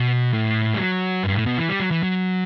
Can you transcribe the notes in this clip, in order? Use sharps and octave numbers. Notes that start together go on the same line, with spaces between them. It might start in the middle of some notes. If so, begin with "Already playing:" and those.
Already playing: B2
A2
G3
F#3
G2
A2
B2
E3
G3
F#3
E3
F#3